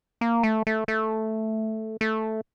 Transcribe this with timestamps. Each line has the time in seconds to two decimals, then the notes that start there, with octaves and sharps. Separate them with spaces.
0.21 A#3
0.43 A3
0.67 A3
0.88 A3
2.01 A3